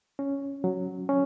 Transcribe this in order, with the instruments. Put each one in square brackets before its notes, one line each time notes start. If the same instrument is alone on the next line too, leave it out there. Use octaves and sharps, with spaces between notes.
[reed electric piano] C#4
F#3
C#4